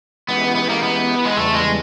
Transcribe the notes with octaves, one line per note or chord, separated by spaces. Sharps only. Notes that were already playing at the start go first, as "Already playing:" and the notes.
E3 G#3 B3 C#4 E4 G4
B3
A#3
B3
G#3
E2 C#3 E3 G3 A3
G#3